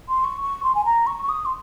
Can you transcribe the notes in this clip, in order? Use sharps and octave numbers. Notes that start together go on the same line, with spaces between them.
C6
C#6
C#6
C6
G#5
A#5
C#6
C#6
D#6
C6